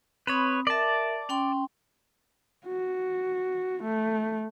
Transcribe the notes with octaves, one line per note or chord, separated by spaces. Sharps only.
C4 B4 C#5 B5 D#6
A#4 D5 E5 A5
C#4 G5 C6
F#4
A3